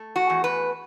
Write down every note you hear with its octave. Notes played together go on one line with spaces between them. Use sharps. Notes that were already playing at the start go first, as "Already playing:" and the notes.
Already playing: A3
F#4
E2
B4